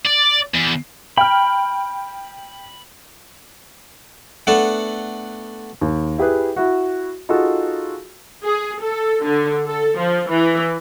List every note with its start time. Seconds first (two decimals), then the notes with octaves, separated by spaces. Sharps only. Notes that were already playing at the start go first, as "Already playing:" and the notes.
0.05 D5
0.54 E2
1.17 G5 B5 F6
4.47 A3 B3 D4 A4 F#5
5.81 D#2
6.18 E4 G4 G#4 B4
6.56 E4 F#4
7.29 D#4 F4 F#4 G#4 A4
8.44 G#4
8.82 A4
9.24 D3
9.67 A4
9.99 F3
10.30 E3